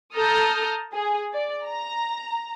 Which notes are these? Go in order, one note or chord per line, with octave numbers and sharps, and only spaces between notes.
A4 A5 A#5 D#6 F6 G6
G#4
D5
A#5